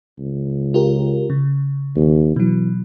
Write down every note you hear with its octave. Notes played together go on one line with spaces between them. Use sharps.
C#2
F4 G4 A#4
C#3
D#2
B2 E3 F#3